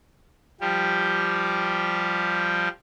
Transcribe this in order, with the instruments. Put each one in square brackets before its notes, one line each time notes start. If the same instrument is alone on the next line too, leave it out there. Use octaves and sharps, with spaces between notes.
[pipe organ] F3 G3 G4